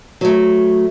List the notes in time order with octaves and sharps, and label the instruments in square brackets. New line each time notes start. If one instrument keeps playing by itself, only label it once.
[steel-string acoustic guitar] F#3 A3